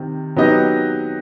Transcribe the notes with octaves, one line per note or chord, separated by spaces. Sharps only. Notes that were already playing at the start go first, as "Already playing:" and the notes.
Already playing: C3 D#3
F#3 B3 D#4 G4 D#5